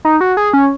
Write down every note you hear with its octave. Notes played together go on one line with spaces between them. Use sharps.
D#4
F#4
G#4
C#4